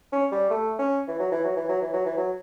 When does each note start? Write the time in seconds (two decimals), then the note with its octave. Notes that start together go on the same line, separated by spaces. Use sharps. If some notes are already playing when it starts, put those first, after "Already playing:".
0.12 C#4
0.32 G3
0.50 A3
0.79 C#4
1.08 E3
1.20 F#3
1.32 E3
1.44 F#3
1.57 E3
1.69 F#3
1.82 E3
1.94 F#3
2.06 E3
2.18 F#3